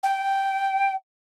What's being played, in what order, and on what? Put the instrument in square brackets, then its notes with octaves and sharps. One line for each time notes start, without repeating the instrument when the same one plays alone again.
[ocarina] G5